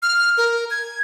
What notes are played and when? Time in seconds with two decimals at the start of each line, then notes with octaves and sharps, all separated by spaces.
0.02 F6
0.37 A#4
0.71 G#6